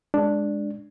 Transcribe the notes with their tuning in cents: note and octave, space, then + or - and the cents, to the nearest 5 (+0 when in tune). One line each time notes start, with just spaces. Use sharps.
G#3 +0 D4 +0